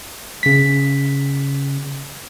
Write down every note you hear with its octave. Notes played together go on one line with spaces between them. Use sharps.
C#3 B6